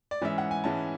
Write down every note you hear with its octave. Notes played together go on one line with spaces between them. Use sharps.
D5
G#2 E3 G#3 C#4 E5
F#5
G#5
G#2 E3 G#3 C#4 A5